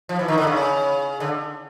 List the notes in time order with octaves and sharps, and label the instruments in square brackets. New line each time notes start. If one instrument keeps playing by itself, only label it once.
[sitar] F3
E3
D#3
D3
C#3
D3